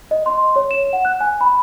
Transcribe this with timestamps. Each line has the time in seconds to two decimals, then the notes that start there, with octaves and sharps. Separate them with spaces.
0.11 D#5
0.26 C6
0.56 C#5
0.71 E7
0.93 F#5
1.05 F#6
1.20 G#5
1.41 B5